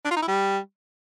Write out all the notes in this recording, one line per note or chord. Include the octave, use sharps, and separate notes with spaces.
D4
F4
D#4
E4
G3